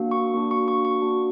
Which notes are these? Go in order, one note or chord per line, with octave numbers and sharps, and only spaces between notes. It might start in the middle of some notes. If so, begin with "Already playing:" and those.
Already playing: A#3 D4 F#4
C#6
A#3 D4 F#4
C#6
C#6
C#6
A#3 D4 F#4